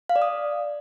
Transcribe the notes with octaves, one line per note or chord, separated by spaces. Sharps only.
F5
D5
D#6